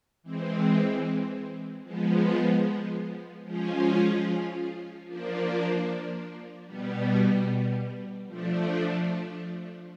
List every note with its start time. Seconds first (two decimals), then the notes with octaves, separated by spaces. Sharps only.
0.23 E3 G#3 C4
1.83 F3 G#3 B3
3.45 F3 G#3 C#4 F4 G#4
5.06 F3 A#3 D4
6.66 B2 G3 B3
8.26 F3 A3 D4